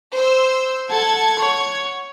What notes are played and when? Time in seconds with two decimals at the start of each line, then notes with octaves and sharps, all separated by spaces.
0.15 C5 E6
0.90 A4 F#5 A5 G#6
1.39 C#5